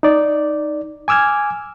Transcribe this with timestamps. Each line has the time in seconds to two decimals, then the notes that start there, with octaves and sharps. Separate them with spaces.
0.03 D#4 D5
1.08 G#5 D6 E6 F6 G#6